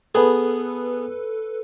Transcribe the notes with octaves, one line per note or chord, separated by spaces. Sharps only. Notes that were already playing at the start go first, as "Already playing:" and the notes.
B3 G#4 A4 B4